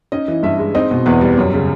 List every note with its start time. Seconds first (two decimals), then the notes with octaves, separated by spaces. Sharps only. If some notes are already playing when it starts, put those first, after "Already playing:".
0.12 C#4 D#4 D#5
0.28 E3
0.43 G2 E4 E5
0.59 G#3
0.75 C4 D#4 D#5
0.91 B2
1.06 E2 B3 B4
1.21 G3
1.38 F#2
1.54 C#3